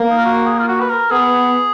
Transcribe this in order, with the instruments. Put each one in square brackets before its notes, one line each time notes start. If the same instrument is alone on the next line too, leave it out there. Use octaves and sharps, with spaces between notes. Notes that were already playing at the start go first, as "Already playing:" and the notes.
Already playing: [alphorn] A#3
[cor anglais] D#4
F4
F#4
G#4
F4
F#4
B4
A#4
[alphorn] B3 [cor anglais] G#4